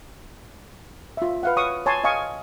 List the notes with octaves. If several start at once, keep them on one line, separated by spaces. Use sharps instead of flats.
F4 E5
B4 F5 F#5
C#5 C#6 D#6
C#5 G#5 A5 C6
D#5 F5 G#5 C#6